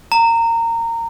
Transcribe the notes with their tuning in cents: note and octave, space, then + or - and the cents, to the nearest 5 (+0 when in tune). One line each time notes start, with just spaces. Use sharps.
A#5 -20